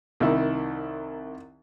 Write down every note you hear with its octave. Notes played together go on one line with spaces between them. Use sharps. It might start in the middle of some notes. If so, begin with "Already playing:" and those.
C2 D#3 E4